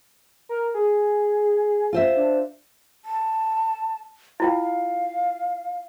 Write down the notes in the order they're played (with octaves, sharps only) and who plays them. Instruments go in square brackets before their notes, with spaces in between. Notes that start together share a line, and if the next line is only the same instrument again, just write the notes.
[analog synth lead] A#4
G#4
[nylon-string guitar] F4 C5 E5
[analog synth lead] D4
[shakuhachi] A5
[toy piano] E4 F4 G5 [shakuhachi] F5